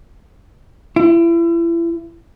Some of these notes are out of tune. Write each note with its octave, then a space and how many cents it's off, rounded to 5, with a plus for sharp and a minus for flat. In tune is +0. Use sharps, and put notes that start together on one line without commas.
E4 +35